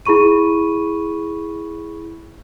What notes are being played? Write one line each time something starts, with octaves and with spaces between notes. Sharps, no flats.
E4 G#4 B5 C#6 D#7